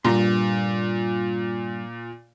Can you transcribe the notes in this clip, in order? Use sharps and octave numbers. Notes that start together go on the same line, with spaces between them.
G2 A#2 A#5 C6